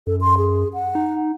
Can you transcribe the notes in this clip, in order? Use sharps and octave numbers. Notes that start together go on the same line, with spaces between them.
F#2 A4
C6
G#4
F#5
D#4